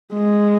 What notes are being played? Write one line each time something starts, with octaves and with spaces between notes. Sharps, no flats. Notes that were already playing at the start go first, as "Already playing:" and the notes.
G#3